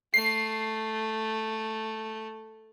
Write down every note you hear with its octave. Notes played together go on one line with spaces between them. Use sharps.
A3 C7